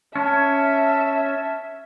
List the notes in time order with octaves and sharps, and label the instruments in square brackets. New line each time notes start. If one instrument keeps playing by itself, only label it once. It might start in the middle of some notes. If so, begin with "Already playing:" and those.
[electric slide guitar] C#4 [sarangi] E5 [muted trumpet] A5